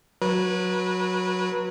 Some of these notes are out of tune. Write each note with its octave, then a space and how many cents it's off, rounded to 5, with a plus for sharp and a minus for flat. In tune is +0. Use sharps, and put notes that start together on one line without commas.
F#3 -10 B4 -30